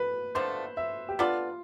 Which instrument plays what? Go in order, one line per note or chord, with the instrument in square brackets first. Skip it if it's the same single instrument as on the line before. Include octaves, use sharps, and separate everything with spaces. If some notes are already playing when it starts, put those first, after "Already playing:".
Already playing: [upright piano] B4
[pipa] D3 F3 A3 [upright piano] C5
[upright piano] E5
G4
[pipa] B3 D4 A4 D5 [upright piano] F4